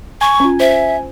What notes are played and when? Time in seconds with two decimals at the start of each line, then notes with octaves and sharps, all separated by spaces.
0.21 G#5 C#6
0.40 C#4 F4
0.60 C5 E5